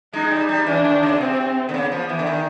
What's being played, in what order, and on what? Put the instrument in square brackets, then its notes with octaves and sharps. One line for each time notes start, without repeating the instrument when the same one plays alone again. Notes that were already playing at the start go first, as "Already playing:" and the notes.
[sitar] G#3 [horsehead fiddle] D#4
[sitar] G3
G3
[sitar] E3 [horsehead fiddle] D4
[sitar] D#3
C#3
B2
[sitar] C3 [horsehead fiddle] C4
[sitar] D3
[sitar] C#3 [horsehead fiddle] B3
[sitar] F3
E3
D3
D#3